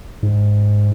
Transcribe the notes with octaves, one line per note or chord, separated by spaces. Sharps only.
G#2